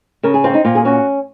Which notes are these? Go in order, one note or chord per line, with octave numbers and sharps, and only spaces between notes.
C#3 A#4
G#4
C4 F4
C#4
D#4
A#2 F4
G#4
C#4 F#4